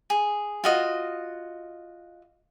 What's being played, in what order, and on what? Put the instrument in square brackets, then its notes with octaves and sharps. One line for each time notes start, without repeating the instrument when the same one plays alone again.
[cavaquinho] G#4
F4 F#4 D#5